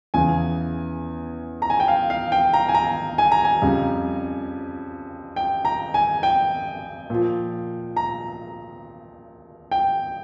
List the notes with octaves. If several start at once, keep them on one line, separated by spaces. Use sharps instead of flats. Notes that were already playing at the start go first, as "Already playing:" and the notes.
E2 C#3 E3 G#5
A#5
G#5
G5
F5
F5
G5
A#5
G#5
A#5
G#5
A#5
G#5
F2 C#3 G3
G5
A#5
G#5
G5
A#2 F3
A#5
G5